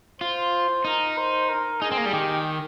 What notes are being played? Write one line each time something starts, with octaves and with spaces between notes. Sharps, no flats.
F4 C5
D#4 A#4
C5
A#4
D#4 G#4
C4
A#3
G3
D#3 G4